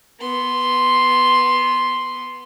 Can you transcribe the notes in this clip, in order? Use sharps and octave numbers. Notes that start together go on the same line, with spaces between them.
B3 C6